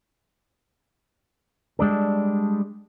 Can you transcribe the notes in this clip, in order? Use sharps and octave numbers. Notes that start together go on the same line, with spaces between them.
G3 G#3 D4 A4